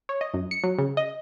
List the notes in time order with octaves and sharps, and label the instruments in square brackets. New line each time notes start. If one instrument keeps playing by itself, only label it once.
[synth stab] C#5
D#5
F#2
C#7
F#3
C#3
D#5